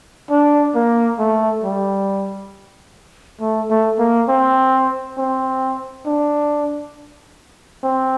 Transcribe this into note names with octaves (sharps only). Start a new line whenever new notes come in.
D4
A#3
A3
G3
A3
A3
A#3
C4
C4
D4
C4